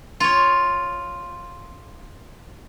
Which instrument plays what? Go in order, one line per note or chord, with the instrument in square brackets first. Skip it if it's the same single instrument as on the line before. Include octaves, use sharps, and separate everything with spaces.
[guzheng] F4 C#5